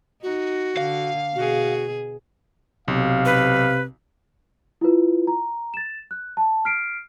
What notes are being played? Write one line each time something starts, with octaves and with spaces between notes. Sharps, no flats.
D#4 F#4
D3 F5
B2 F#4 G#4
B1 C3 F5
B4
E4 F4 B4
A#5
A6 E7
F#6
A5
F6 B6 C7 D7